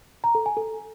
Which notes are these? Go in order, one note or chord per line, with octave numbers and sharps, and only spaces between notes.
A#5
A4
G#5
A4